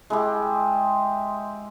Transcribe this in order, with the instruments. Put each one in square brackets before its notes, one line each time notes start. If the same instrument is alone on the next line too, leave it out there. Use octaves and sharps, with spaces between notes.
[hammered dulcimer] G#3 E4 G4